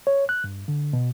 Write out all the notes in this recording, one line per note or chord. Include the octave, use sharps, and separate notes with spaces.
C#5
F#6
G2
D3
B2